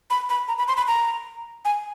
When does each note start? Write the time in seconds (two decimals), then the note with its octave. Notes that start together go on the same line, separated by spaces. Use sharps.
0.10 B5
0.29 B5
0.48 A#5
0.58 B5
0.68 C6
0.77 B5
0.88 A#5
1.65 G#5